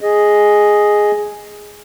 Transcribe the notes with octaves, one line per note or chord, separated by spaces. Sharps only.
G#4 D#5